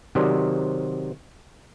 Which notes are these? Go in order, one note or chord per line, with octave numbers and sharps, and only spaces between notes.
C3 D#3 F#3 C5 D5